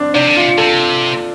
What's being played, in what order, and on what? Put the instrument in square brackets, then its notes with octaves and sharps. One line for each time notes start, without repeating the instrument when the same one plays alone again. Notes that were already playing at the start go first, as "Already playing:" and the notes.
Already playing: [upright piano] C4 D4
[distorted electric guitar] C3 [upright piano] D4
[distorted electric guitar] D3
[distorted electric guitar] C3 [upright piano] F4
[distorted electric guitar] C3 [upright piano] A4